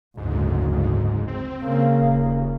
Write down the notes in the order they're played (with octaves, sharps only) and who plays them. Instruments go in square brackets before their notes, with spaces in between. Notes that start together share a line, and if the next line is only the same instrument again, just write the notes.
[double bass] F#1 D2 [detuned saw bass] G#2
[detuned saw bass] G#2
C4
[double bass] C#3 A#3
[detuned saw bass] D#1